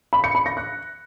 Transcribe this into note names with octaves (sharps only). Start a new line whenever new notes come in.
B5
C#7
B5
A#6
F#6